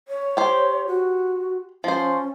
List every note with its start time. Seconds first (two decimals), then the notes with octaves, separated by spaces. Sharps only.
0.08 C#5
0.37 G4 C5
0.87 F#4
1.84 F3 C#4 C5